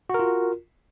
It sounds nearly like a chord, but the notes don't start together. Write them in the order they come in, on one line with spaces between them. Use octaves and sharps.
F#4 A#4 F4